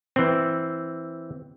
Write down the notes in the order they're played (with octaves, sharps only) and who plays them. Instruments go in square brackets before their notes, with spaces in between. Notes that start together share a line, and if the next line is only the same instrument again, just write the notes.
[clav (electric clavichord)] E3 C4